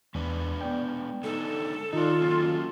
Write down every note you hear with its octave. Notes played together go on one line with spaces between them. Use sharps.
E2 G#3 D4 B4
B3 D5 G5
D3 G#3 D#4 A4
D#3 D#4 F4 D5 D#5
F#3 A#3 C#4